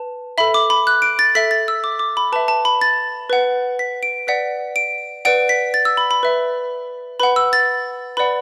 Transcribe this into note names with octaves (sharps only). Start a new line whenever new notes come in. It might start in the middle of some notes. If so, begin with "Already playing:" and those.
Already playing: B4 A5
A4 E5 B5
D6
B5
F#6
D7
A6
A4 E5 B6
A6
E6
D6
D6
B5
B4 E5 A5
A5
B5
A6
B4 F#5
B6
D7
B4 D5 F#5 B6
D7
B4 D5 F#5 D7
B6
A6
E6
B5
B5
B4 E5
B4 F#5 B5
E6
A6
B4 D5 F#5 B5